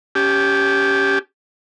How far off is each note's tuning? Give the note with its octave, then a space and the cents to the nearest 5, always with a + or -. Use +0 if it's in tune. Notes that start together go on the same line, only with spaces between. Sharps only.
C#4 +10 G4 +0 A5 -45